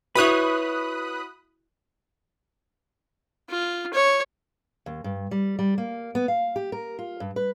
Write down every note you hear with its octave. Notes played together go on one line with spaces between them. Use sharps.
E4 F#4 B4 C#5 B5 D#6 F#6
F4
C#5
D#2
G2
G3
G3
A#3
B3
F5
G4
A#4
F4
G2
B4